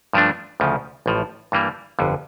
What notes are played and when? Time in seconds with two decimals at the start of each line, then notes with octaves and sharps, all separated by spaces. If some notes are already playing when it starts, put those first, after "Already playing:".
0.13 G2 F3 A3 D4
0.60 D2 C#3 F3
1.06 A1 A2 F3
1.52 G2 E3 G3 A#3
1.99 G1 F2 D3